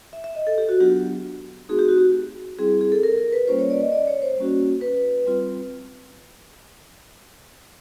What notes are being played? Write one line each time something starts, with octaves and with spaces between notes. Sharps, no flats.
E5
E5
D#5
A4
G4
F#4
F#3 B3 D4 F4 G4
A3 C4 D#4 F#4 G#4
G4
F#4
G4
G3 C4 E4 G#4
G#4
A4
A#4
A#4
B4
G3 A#3 C#4 F4 C5
C#5
D5
D#5
D5
C#5
C5
G3 A#3 C#4 F#4
B4
G3 C4 F4